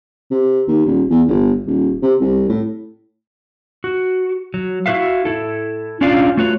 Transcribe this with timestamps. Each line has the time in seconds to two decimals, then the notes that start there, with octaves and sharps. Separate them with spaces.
0.31 C3
0.68 D#2
0.86 D#1
1.10 E2
1.28 G1
1.67 D#1
2.02 C3
2.21 C2
2.49 A2
3.84 F#4
4.54 F#3
4.86 E4 F#4 G4 B4 E5 F5
5.25 E4 A4
6.01 C#4 D4 F4 D5 F5
6.37 A3 F4 F#4 B4 C#5